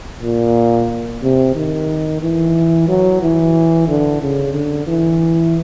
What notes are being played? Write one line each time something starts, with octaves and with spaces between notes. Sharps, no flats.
A#2
C3
D#3
E3
F#3
E3
D3
C#3
D3
E3